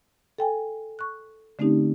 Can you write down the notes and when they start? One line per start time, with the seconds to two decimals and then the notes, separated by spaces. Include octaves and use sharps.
0.38 A4 G5 G#5
0.99 C#6 F#6
1.59 D3 A3 C4 C#4 D#4 G4